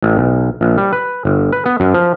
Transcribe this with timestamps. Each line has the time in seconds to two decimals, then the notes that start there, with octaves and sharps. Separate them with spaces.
0.02 A1
0.17 B1
0.61 A#1
0.78 G3
0.93 B4
1.25 G1
1.52 B4
1.66 B3
1.80 F#2
1.94 F3